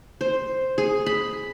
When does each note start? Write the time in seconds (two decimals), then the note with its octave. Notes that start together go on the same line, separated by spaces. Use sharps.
0.21 C5
0.78 G#4
1.06 B5